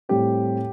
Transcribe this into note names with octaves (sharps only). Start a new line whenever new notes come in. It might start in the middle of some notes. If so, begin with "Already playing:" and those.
A2 G3 C4 G4